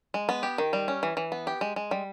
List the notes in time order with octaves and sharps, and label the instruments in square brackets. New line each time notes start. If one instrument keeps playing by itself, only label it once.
[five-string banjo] G#3
B3
G4
D#3
G3
C#4
E3
E3
B3
G4
G#3
G#3
G3